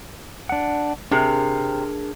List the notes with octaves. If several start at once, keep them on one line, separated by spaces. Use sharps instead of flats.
D4 F#5
C3 D4 G#4 A#4